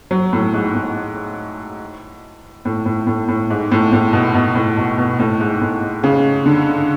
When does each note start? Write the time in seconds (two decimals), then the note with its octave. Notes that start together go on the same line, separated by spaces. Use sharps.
0.11 F#3
0.33 A2
0.54 G#2
0.75 A2
2.65 A2
2.86 A2
3.07 A2
3.28 A2
3.50 G#2
3.72 A2
3.93 A2
4.13 B2
4.34 B2
4.55 A2
4.77 B2
4.97 B2
5.19 A2
5.40 G#2
5.61 A2
6.04 C#3
6.46 D3